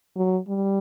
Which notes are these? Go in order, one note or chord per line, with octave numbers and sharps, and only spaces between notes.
F#3
G3